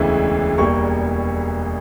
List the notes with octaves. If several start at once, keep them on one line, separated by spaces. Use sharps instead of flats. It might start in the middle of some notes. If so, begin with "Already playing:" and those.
Already playing: E1 D2 C#3 E3 G#3
E1 E2 B2 G3 A#3 C#6